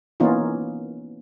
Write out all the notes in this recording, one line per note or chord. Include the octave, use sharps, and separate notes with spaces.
E3 A#3 B3 C#4 D#4 F4